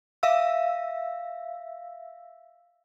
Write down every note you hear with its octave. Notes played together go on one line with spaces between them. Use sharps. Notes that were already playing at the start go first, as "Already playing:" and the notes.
E5 F5 E6